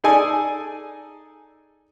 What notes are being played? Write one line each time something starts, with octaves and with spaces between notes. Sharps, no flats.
D#4 G#4 A4 D5 G#5